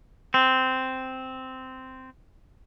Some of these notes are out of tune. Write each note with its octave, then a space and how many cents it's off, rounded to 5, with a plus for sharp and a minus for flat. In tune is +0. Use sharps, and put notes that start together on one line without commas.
C4 -10